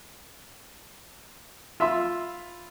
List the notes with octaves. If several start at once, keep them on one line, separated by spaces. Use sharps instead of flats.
F4 E5 B5 C6 E6